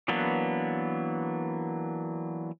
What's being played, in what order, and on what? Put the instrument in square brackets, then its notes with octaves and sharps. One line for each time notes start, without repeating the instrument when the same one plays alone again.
[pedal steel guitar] E3 F#3 A#3 B3 D4